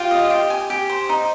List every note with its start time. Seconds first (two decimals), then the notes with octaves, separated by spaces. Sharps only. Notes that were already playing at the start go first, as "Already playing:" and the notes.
Already playing: F4 G4
0.11 D#5
0.30 G4
0.50 G#5
0.70 G4
0.89 C5
1.09 D#4